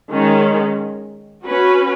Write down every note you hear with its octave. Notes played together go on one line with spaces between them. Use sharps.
D#3 G#3 C#4
C#4 F#4 B4